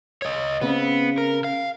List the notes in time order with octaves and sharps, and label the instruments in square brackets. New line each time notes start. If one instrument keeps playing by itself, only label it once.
[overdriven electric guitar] C#5 D#5
[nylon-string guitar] C#3 C4 [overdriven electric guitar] B3
[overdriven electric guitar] A#4
F5